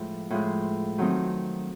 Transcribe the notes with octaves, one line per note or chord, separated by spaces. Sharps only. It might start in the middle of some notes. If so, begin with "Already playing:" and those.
Already playing: A2 F3 G#3
A2 F3 G#3
D#3 F#3 A3 C4 D#4